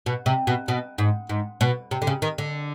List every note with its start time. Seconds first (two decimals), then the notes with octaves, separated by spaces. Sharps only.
0.06 B2
0.26 C3
0.47 B2
0.68 B2
0.98 G#2
1.29 G#2
1.61 B2
1.91 C3
2.02 D3
2.07 C#3
2.22 D#3
2.38 D3